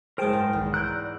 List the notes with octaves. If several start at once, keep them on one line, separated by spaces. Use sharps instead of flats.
F#1 G#3 G#4 A#4 C5 G5 A5 D#6
G#2
B1 E2 D#3
A#5 E6 F#6 G6 D7
D5